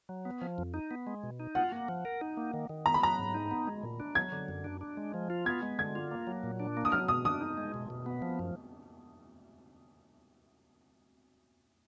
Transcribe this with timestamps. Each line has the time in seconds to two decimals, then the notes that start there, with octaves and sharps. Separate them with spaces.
0.09 F#3
0.25 B3
0.42 F3
0.58 F2
0.74 D#4
0.91 B3
1.07 G#3
1.23 B2
1.40 D#4
1.55 F4 F#5
1.72 A#3
1.88 F3
2.05 A#4
2.21 D#4
2.37 A#3
2.54 D#3
2.69 D#3
2.86 B3 A#5
2.94 B5
3.02 F#3 A#5
3.19 G#2
3.34 D#4
3.51 B3
3.67 G#3
3.83 A#2
4.00 D4
4.15 F#3 G#6
4.32 D3
4.49 F#2
4.64 D4
4.81 D4
4.97 G#3
5.14 F3
5.30 F4
5.46 B3 G#6
5.63 G#3
5.79 D3 G#6
5.95 F4
6.11 A#3
6.27 F#3
6.43 A#2
6.60 D4
6.77 A#3
6.85 D#6
6.92 F#3 F6
7.08 B2 D#6
7.25 D4 D#6
7.41 D#4
7.57 G#3
7.74 B2
7.90 B2
8.06 B3
8.22 F3
8.39 F#2